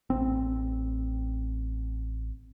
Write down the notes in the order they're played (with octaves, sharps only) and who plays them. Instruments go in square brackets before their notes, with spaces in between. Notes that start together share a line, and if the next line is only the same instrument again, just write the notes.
[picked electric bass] A1 C4